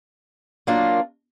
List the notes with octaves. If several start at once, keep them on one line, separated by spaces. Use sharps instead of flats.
F#3 A#3 D4 F4 A#4